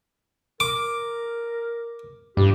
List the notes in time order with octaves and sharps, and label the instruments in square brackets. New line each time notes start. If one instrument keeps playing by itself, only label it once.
[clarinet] A#4 [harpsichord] D6
[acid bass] G2 [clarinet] G4